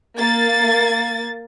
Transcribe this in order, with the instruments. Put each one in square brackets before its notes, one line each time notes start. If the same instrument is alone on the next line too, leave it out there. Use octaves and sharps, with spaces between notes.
[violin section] A#3 A6